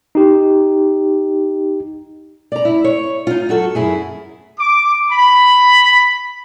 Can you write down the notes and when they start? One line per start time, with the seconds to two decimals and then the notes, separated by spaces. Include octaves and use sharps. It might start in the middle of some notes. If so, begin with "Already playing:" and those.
0.15 D#4 G4
2.52 D5 A#5
2.65 E4
2.84 C#5
3.27 D#4 F4
3.49 F#3 F#4 A4
3.75 F#2 E4 G#4
4.59 D6
5.10 B5